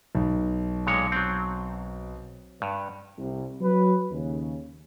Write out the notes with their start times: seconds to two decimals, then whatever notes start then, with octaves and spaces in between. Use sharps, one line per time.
0.15 B1
0.87 A#2 G#3 C#5
1.12 F#3 C4
2.62 G2
3.18 C2
3.61 F#3 B4
4.11 D#2 C#3